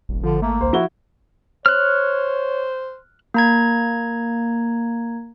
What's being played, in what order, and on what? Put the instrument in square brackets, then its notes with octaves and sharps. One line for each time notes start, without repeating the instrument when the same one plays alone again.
[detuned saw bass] D#1 [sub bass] G#1
[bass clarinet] D3 [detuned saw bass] F3
[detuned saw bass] A3 [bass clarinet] A#3
[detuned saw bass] C#2 [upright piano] C5
[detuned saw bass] F3 [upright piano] E4 F#4 G7
[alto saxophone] C5 [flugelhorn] C#5 [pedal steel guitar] F6 F#6
[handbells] A#3 A#5 G#6